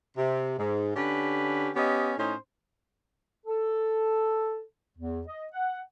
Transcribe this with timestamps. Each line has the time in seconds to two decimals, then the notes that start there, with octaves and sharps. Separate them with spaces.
0.17 C3
0.58 G#2
0.95 D3 C#4 G4 B4
1.75 B3 C#4 G4 D#5
2.18 A2 C#4 D#4 C5
3.47 A4
4.98 E2
5.28 D#5
5.53 F#5